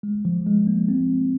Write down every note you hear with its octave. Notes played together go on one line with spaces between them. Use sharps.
G#3
F3
G#3
A#3
C4